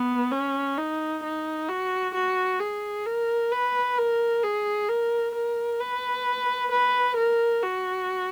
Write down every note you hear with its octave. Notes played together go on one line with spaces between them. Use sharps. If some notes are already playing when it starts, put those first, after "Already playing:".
Already playing: B3
C#4
D#4
D#4
F#4
F#4
G#4
A#4
B4
A#4
G#4
A#4
A#4
B4
B4
A#4
F#4